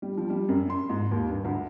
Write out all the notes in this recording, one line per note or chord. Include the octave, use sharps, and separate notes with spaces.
G3
F3
G3
F#2
C6
G#2
D#2
G2
D2